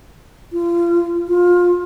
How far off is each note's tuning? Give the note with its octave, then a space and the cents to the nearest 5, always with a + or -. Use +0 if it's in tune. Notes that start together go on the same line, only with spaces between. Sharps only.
F4 -30
F4 +20